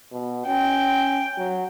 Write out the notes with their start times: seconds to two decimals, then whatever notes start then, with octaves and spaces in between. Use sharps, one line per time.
0.12 B2
0.47 C#4 G5
1.38 F#3